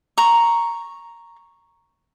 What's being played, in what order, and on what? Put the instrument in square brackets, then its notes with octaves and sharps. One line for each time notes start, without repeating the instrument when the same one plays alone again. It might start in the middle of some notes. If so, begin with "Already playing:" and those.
[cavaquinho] A#5 C#6